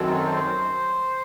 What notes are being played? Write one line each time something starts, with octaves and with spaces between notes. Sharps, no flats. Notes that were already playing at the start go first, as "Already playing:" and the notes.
Already playing: F#2 D#3 F#3 C4 A4
C5